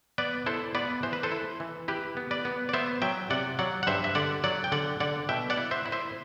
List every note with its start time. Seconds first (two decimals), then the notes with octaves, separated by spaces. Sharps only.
0.18 B3 B4 D5
0.46 E4 A4 C5
0.75 B3 B4 D5
1.03 E3 C5
1.13 B4
1.23 A4 C5
1.32 E4
1.60 E3
1.88 E4 G4 B4
2.17 B3
2.31 B4 D5
2.45 B3
2.69 D5
2.73 B3 C5 E5
3.02 F#3 E5 G5
3.30 C3 D5 F#5
3.59 F#3 D5 F#5
3.83 F#5
3.87 G2 C5 E5
4.04 E5
4.15 D3 D5 F#5
4.44 F#3 D5 F#5
4.64 G5
4.72 D3 D5 F#5
5.00 D3 D5 F#5
5.29 B2 E5 G5
5.50 D5 F#5
5.58 E4
5.71 C5 E5
5.86 E4
5.92 C5 E5